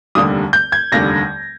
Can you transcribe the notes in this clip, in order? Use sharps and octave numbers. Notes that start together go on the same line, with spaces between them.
F1 D#2 D3 G3 D#6
G6
G#6
F1 D#2 D3 G3 A#6